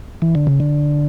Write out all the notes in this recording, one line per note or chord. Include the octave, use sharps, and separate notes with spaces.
E3
D3
C#3
D3